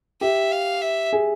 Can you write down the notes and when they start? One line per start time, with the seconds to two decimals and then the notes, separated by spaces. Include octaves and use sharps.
0.21 G4 E5
0.52 F5
0.82 E5
1.13 G#4